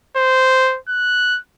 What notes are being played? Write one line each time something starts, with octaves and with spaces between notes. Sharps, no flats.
C5
F#6